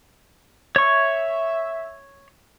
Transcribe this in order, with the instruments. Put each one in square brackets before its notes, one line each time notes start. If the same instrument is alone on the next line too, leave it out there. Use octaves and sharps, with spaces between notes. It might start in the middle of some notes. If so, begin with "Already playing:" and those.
[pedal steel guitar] C#5 C#6 [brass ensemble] E5